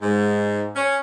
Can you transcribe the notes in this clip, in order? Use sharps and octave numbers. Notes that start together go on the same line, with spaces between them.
G#2
C#4